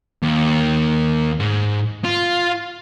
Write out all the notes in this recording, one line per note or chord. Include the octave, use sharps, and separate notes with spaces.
D#2
G#2
F4